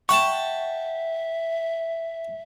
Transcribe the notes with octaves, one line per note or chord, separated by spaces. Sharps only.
E5 F#5 G5 A5 C#6